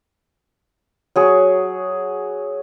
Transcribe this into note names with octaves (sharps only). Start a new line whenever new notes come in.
F#3 G#4 C#6